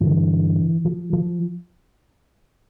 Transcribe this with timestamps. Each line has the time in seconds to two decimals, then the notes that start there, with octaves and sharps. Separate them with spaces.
0.01 G2 D3 E3
0.85 F3
1.13 F3